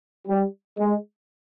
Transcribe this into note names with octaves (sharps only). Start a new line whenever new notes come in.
G3
G#3